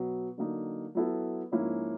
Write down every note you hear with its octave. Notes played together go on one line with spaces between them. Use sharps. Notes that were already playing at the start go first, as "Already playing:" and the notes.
Already playing: B2 F#3 B3
D3 F#3 A#3 D#4
F#3 B3 E4 A4
G#2 F3 A#3 C#4 E4